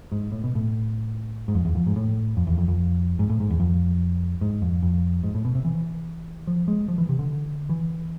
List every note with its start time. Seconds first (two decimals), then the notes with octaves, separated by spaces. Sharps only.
0.12 G#2
0.32 A2
0.44 B2
0.55 A2
1.48 G#2
1.55 F2
1.65 E2
1.75 F2
1.87 G#2
1.96 A2
2.37 F2
2.47 E2
2.58 F2
2.68 F2
3.19 G#2
3.30 A2
3.40 G#2
3.50 E2
3.60 F2
4.41 G#2
4.62 F2
4.83 F2
5.23 G#2
5.35 A2
5.45 B2
5.55 C3
5.65 E3
6.47 F3
6.68 G#3
6.88 F3
6.98 E3
7.09 C3
7.19 D3
7.69 E3